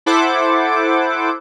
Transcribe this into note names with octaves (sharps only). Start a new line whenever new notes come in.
E4 A4 C5 F#5 D6